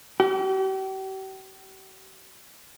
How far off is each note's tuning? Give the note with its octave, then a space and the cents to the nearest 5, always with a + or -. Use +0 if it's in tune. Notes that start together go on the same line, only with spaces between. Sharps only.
G4 -40